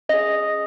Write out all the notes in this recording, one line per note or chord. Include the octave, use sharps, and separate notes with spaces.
C#4 G#4 D#5